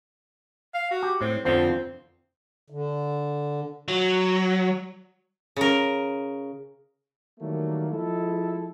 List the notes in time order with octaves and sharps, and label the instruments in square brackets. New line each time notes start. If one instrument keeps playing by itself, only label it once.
[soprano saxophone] F5
F#4
[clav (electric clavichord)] G4
[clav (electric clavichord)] A2 [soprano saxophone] C4
[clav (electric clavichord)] F2 D3 F3 [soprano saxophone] C4
[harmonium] D3
[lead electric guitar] F#3
[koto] C#3 A#4
[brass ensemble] D#3 E3 F#3 G3 A3 A#3
F3 G#3 E4 A4